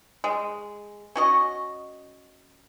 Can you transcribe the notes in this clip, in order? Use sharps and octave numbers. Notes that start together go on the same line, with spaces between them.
G#3
C#4 F#4 D#5